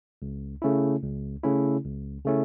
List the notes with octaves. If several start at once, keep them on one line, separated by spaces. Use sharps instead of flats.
C#2
C#3 A3 C#4 E4
C#2
C#3 A3 C#4 E4
C#2
C#3 A3 C#4 E4